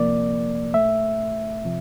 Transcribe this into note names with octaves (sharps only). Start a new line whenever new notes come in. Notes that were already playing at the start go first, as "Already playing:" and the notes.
Already playing: D2 C3 F3 A#3 D5
A#2 A3 E5
C3 F3